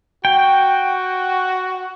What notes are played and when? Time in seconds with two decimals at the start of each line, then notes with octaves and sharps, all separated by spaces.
0.25 F#4 G5